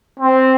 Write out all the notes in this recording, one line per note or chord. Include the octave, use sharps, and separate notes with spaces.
C4